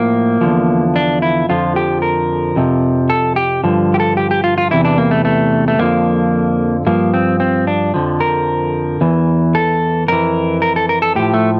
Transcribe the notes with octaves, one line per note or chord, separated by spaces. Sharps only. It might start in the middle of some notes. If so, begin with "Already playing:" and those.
Already playing: A2 F3 A#3
E2 D3 F3
D4
E4
F2 D3 F3 F4
G4
A#4
F2 C3 F3
A4
G4
G2 D3 F3
G4
A4
G4
G4
F4
F4
E2 C3 E3 E4
D4
A#3
A3
A3
A3
F2 D3 F3 A#3
G2 F3 A#3
C4
C4
D4
F2 D3 F3
A#4
E2 E3
A4
F2 E3 A#4
A#4
A4
A#4
A4
A2 F3 G4
A3